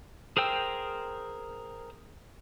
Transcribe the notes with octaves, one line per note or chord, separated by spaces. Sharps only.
G#4 A#4 C5 G5 E6